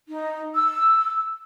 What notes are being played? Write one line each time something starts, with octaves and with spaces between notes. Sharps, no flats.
D#4
E6